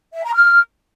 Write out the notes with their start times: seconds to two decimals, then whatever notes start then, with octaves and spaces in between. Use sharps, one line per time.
0.13 E5
0.24 A#5
0.34 F6